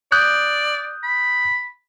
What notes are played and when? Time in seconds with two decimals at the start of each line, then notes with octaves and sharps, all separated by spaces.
0.12 D5 D#6 F#6 G6
1.03 B5